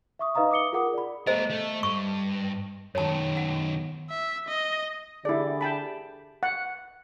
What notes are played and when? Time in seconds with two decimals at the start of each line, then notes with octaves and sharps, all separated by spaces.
0.19 E5 C#6 D#6
0.35 D#4 B4 D#5 F5 A#5 D#6
0.51 D6 D#6 C#7 G7
0.72 F4 G#4 A#4 F#5 D6 D#6
0.94 D5 B5
1.27 A3 A#4 C5 D#5
1.50 A3
1.83 G2 C#6
2.95 F#2 D#3 C#5 A5
3.37 F#5
4.10 E5
4.48 D#5
5.25 D3 E4 G4 G#4 D5
5.61 G5 A5 B5
6.43 F#5